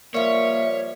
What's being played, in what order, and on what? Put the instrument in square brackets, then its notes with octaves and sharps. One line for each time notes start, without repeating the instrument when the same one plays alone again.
[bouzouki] F3 G3 [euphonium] A#3 [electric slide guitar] C#5 [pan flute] E5